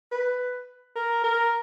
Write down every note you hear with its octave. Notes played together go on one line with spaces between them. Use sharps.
B4
A#4
A#4